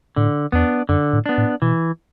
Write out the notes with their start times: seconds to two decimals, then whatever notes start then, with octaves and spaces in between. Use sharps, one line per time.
0.16 A2 D3
0.52 E2 B3 D4
0.89 F#2 D3
1.13 A2
1.26 B3 D4
1.38 A2
1.62 B2 E3